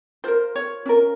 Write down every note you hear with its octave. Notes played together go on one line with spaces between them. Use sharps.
F4 A#4 C5
C#5
C#4 F4 A#4